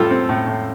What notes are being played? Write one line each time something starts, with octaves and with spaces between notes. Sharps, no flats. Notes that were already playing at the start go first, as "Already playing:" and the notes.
Already playing: A2 G3 F4 A4
C4
A2
A2